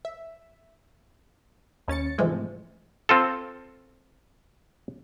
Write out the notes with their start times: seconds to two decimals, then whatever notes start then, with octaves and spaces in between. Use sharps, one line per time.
0.05 E5
1.88 D#2 C#4 A6 C#7
2.18 G#2 C3 E3 F3 G#3 A3
3.09 C4 F4 A4